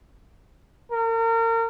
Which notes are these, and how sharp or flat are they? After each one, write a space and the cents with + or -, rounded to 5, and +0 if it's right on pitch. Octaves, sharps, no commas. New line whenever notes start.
A#4 -35